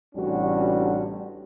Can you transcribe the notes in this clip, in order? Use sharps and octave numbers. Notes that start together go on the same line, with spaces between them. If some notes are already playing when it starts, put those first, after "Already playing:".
A1 C3 G3 C#4 D4 F#4